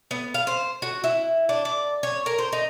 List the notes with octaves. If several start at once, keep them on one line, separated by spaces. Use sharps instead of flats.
B3
F5
C5
F#4
E4
D4
D5
C#5
A#4
C5
D#4